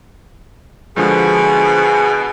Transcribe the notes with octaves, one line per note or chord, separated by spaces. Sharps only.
B2 D3 F3 G#3 G#4